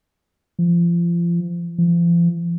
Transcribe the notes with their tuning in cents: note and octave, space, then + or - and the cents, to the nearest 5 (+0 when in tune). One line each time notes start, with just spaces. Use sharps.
F3 -30
F3 -40